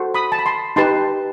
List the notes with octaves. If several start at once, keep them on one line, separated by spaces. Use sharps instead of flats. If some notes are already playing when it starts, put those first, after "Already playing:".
Already playing: F#4 A4 C5
B5 D#6
A5
B5
A5 C6
D#4 G4 B4 A5 C6